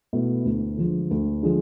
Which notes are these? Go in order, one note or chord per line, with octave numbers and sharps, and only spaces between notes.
B2 A3 E4
D2
D3 F3 G#3
D2
D3 F3 G#3